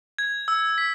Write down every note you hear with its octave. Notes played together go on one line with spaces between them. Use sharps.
G#6
E6
B6